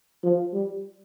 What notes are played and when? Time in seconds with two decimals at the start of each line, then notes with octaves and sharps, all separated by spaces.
0.24 F3
0.53 G3